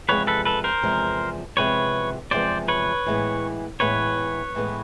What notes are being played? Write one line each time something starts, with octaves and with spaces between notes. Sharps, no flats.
E2 C3 F3 G#3 B3 B4 C#5
A4 B4
A4 B4
A#4 C5
E2 C3 F3 G#3 B3
E2 C3 F3 G#3 B3 B4 C#5
E2 C3 F3 G#3 B3 C5 D5
B4 C#5
A2 E3 G#3 B3
A2 E3 G#3 B3 B4 C#5
A2 E3 G#3 B3